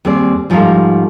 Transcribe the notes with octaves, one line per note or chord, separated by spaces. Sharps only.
D#2 G3 C4 G#4 D5
G#2 F3 G3 A3 A#4 F5